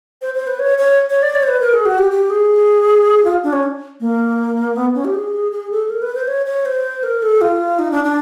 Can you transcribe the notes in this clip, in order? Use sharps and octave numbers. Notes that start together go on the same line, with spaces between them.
C5
C5
B4
C#5
C#5
C#5
D5
C#5
C5
B4
A#4
G#4
F#4
G4
G4
G#4
F4
D4
C#4
A#3
B3
C#4
G4
G#4
G#4
A4
A#4
B4
C5
C#5
C#5
C5
A#4
A4
F4
D#4
D4
D4